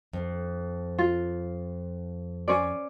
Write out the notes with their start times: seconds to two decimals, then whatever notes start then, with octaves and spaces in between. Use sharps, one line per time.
0.13 F2
0.99 F4
2.48 C#4 C5 D5